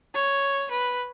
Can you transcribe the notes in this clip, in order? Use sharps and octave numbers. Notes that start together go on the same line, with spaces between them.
C#5
B4